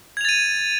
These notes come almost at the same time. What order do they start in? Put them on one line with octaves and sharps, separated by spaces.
G#6 F7 A6 D#7